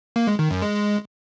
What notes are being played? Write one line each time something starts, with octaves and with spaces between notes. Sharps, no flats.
A#3
G#3
D#3
F#2
G#3